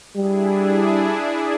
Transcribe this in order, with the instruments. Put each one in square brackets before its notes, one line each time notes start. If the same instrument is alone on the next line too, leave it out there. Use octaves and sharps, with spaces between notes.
[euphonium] G3 [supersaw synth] D4 E4 G#4